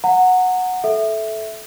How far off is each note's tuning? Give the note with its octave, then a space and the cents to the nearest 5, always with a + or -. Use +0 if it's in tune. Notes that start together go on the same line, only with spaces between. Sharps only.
F#5 -10 A#5 -20
A4 -20 E5 +0